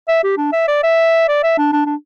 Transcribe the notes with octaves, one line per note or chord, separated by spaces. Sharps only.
E5
G4
D4
E5
D5
E5
D5
E5
D4
D4
D4